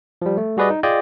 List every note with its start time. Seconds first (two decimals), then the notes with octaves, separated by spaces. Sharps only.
0.22 F3 G3
0.37 A3
0.57 G3 F#4 G#4 B4 D5 D#5
0.70 D#4
0.83 F4 G#4 D5 D#5 G5 G#5